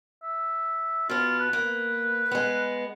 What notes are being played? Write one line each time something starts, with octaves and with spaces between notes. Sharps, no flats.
E5
B2 B3 F4
B4
A#3
G#3 B3